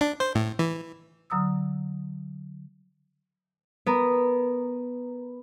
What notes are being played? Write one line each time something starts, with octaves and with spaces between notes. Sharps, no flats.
D4
C5
A2
E3
D3 F#3 A#5 D#6 E6
B3 A#4